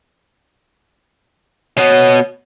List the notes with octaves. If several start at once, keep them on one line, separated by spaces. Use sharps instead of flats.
B2 B3 C#5